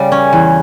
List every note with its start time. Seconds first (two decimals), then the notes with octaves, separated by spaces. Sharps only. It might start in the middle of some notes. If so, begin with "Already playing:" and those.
Already playing: C#3 G3
0.12 C#4
0.33 E2